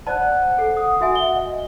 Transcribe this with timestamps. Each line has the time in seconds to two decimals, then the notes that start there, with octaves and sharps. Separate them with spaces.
0.07 C5 D5 F#5 A5 F#6
0.58 A4 C7
0.77 D#6
1.01 F#4 E5 G#5
1.15 F#5 G7
1.35 D#5